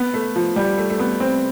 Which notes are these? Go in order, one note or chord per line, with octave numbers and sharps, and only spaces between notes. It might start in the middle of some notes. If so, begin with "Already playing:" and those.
Already playing: B3
A3
F3
G3
A3
A3
B3
C4